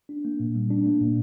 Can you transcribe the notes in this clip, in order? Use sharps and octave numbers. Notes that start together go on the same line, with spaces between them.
D4
A#3
A#2
G3
D4
A#3
A#2